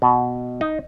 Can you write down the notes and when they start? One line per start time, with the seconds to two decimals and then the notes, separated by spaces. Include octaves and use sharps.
0.02 B2
0.61 D#4